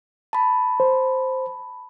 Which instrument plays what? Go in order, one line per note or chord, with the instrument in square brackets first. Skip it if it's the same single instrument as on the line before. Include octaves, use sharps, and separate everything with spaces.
[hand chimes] A5 B5
[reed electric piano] C5